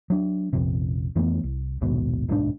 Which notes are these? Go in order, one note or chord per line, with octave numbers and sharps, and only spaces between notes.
F#3 D4
A#1 F2 C3
F2 E3 A3 B3
C2
A#1 D#2 G#2 B2
D1 B1 G#2 D4